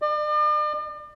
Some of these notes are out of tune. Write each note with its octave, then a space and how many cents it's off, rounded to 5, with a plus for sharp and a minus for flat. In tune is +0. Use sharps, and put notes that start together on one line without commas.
D5 +40